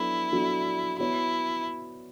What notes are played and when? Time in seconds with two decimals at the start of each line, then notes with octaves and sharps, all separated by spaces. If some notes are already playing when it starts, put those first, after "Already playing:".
Already playing: F#3 B3 D4 E4 F#4 A4
0.32 F#3 B3 D4 F#4 A4
1.00 B3 E4 F#4 C#5